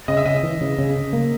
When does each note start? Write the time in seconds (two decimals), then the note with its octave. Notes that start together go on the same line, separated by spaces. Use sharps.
0.08 C#3 D#5
0.17 E5
0.26 C#3 D#5
0.43 E3
0.61 C#3
0.79 C#3
0.96 C#3
1.13 A#3